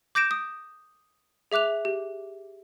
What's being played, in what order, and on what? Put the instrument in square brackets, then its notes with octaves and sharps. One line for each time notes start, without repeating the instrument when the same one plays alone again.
[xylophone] D6 G6 A#6 D7 E7
D#6
G#4 E5 D6 F#6 F7
G4